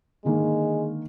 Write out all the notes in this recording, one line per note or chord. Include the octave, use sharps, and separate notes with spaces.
D3 D#3 G#3 A#3